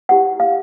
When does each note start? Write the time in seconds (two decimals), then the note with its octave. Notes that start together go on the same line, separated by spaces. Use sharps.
0.09 E4 G4 B4 F#5
0.40 F5